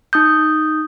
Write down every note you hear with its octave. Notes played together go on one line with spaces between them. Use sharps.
D#4 D#6 G6